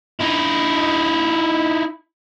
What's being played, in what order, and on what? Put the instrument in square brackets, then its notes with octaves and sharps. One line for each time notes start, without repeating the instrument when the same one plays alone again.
[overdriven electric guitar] D#4 E4